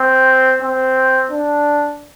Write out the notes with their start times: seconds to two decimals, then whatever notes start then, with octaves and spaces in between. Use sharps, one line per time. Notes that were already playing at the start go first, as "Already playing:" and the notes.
Already playing: C4
0.62 C4
1.31 D4